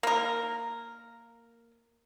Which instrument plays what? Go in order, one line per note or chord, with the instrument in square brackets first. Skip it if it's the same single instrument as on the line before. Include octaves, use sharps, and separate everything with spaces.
[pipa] A#3 A#4